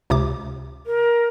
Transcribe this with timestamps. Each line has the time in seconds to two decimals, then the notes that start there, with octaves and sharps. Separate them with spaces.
0.10 C#2 C3 D6
0.86 A#4